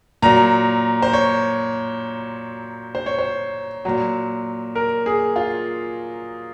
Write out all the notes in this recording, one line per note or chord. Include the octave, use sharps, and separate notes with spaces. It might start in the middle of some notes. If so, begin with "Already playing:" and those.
A#2 F#3 A#5
C5
C#5
C5
C#5
C5
A#2 F#3
A#4
G#4
F4